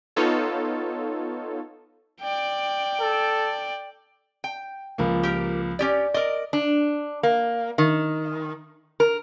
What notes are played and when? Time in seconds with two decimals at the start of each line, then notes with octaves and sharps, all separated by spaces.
0.16 B3 D#4 F4 A4 C#5
2.22 D5 G5
3.01 A4
4.44 G5
4.98 C#2 F3 A#3
5.23 G4 A#4
5.79 C#4 G4 D5
6.14 A#4 D5 D#5
6.53 D4
7.23 A#3
7.78 D#3
9.00 A#4